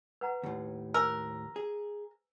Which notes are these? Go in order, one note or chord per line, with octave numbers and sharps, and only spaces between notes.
B4 F#5 A#5
D#2 A2
A#4 C5 G#5 E6
G#4